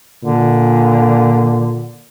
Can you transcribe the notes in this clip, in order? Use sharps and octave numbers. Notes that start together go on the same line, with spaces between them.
A#2 D3